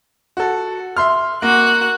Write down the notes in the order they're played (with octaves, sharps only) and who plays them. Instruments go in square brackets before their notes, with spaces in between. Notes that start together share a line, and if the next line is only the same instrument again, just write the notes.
[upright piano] F#4 A4
E5 C6 F6
[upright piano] A#3 [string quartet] F#4 F#6